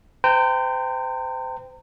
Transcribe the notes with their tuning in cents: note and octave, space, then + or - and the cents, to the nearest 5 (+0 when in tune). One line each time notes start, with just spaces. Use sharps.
C5 -35 G5 +0 A#5 -35